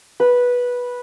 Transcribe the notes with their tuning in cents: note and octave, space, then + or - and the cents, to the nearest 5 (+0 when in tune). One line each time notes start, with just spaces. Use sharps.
B4 -10